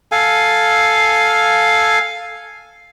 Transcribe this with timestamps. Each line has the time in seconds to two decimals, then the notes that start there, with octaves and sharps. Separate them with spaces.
0.12 A4 F5 G#5